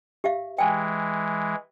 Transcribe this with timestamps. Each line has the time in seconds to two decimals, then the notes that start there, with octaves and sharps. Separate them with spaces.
0.24 G4 E5 F5
0.58 E3 G#3 G5 G#5